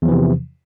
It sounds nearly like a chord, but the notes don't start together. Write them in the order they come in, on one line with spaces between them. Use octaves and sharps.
E2 F3 E3 C3